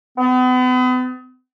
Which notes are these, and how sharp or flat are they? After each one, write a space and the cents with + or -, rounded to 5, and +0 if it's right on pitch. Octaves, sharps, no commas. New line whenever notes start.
B3 +40